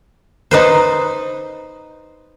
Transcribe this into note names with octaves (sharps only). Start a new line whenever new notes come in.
D#4 B4 C5